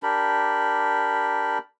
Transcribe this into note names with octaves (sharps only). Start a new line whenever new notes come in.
D4 G4 A#4 B5